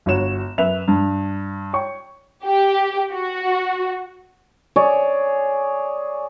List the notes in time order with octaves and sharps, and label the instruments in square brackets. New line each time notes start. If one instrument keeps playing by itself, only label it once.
[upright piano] G1 F#4 C#5 E7
F#2 B4 E5 F7
G2
C#5 G5 C#6
[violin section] G4
F#4
[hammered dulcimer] G#4 C#5 D5